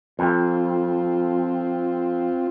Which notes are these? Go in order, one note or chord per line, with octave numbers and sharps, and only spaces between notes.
F2 C4 F4